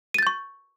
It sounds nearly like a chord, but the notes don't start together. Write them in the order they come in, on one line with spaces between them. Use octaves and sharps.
D#7 A6 G6 C#6